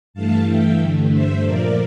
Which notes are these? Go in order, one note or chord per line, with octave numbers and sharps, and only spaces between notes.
G2 E3 A3 F5 A5
E5 G5
G2 D3 A3
C5 E5
A#2 F3 A#3 A#4 D5